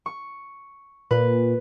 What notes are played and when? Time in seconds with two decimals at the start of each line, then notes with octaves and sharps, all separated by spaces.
0.06 C#6
1.11 A#2 B4